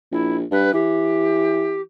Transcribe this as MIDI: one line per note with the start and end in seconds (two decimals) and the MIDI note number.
0.12 0.44 34
0.12 0.36 64
0.51 0.71 43
0.51 0.72 71
0.73 1.79 52
0.73 1.80 67